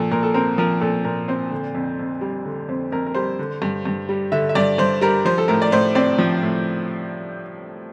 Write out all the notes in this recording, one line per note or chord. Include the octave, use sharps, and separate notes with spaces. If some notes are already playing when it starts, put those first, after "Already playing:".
Already playing: A#2 F3 A4
A#2 A#4
A4
C4 A#4
F3 A#4
A#2 A4
A#2 A#4
C4 C5
D3
F2
F2
G3
D3
F2 C5
F2 A#4
A#4
G3 C5
D3
G2
G2
G3
D3 E5
E5
G2 D5
G2 C5
G3 A#4
F3 C5
A4
A2 A#4
D5
A2 C5
C4 D5
F3
A2